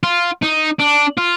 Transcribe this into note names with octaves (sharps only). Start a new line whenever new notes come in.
F4
D#4
D4
F4